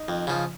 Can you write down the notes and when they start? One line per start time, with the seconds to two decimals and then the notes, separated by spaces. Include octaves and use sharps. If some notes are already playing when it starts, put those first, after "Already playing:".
Already playing: D#4
0.08 F2
0.27 C#3 F3